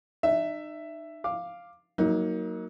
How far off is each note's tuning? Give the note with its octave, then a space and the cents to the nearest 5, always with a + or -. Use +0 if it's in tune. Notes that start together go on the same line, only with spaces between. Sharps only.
D#4 -35 E5 +10
F5 +0 D6 +10
F#3 +0 A#3 -5 D#4 +25